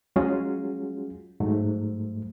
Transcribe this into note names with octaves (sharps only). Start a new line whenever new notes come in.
F#3 G#3 C#4 F4 F#4 G#4
G#2 F#3 A3